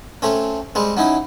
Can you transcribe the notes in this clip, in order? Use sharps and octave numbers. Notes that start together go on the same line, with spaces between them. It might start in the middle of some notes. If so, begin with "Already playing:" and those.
A3 C4 C#4
G3 G#3 C4
F#3 C#4 D#4 E4